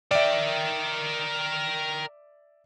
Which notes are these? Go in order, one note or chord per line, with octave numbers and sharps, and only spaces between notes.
A#4 D5 E5 G5